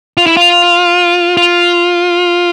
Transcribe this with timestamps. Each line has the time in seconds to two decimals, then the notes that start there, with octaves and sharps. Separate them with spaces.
0.17 F4
0.27 E4
0.37 F4
1.37 F4